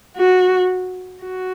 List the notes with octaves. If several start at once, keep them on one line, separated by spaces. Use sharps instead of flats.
F#4
F#4